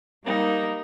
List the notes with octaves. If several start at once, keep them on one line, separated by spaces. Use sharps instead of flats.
G3 A#3 D#4